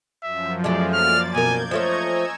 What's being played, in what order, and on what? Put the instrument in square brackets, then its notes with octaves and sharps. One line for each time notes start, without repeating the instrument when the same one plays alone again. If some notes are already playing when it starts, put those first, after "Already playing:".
[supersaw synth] F#2 F3 [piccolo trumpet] E5
[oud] G#3 A3 [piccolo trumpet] D5
[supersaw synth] A#3 D5 A6 [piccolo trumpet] F6
[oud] B2 A#4 [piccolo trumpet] G#5 [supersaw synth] G6 G#6
[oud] F3 A3 C#5 [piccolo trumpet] D#5 [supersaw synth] A#5 C#6 G#6
[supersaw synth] G#5 E6